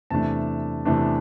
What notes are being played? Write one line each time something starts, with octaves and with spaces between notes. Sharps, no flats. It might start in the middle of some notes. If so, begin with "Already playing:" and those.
E2 C3 E3 A3 D4 A5
E2 C3 E3 A3 D4